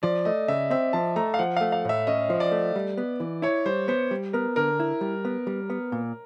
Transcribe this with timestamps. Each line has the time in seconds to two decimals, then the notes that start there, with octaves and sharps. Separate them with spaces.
0.03 F3 D5
0.25 A3 D#5
0.48 C#3 E5
0.70 C4 E5
0.93 F3 A5
1.16 A3 A#5
1.34 F5
1.39 F3 F#5
1.56 A3 F5
1.72 F5
1.85 A2 E5
2.07 C#4 D#5
2.30 F3
2.40 D5
2.52 A3
2.76 G3
2.97 B3
3.20 E3
3.42 E4 C#5
3.66 G3 C5
3.88 B3 C5
4.11 G3
4.33 B3 A#4
4.56 D3 A#4
4.80 E4
5.01 G3
5.25 B3
5.47 G3
5.70 B3
5.92 A#2